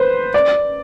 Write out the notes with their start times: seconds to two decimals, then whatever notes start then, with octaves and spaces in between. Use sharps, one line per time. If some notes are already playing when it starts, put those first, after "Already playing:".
Already playing: B4 C5
0.34 D5